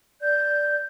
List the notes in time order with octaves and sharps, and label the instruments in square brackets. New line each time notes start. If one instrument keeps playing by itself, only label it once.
[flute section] D5 G6